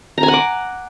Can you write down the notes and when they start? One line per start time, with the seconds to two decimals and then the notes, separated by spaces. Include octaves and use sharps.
0.18 A#5
0.23 G#5
0.28 F#5
0.34 D6